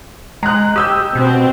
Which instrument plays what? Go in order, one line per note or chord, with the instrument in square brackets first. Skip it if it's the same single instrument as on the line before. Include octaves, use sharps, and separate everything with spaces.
[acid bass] G#3 [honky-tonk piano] A#5 F#6
[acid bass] G4 [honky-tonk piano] D#6 E6 G6
[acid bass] B2 [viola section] C4